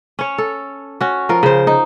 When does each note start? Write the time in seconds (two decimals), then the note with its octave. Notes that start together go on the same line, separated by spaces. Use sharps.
0.19 C#4 C#5
0.38 A4
1.01 C#4 F#4
1.29 F3 A#4
1.43 C#3 C5
1.67 D#4